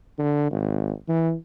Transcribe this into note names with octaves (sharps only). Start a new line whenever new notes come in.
D3
G#1
E3